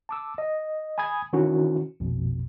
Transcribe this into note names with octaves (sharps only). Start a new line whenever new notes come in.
A5 D6 E6
D#5
G#5 B5 D#6 G#6
D#3 E3 C#4 D4 E4 F#4
A#1 F2 B2